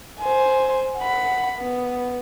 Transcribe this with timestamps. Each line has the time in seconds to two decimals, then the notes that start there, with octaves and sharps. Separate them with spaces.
0.20 C5 G#5
0.99 F#5 B5
1.59 B3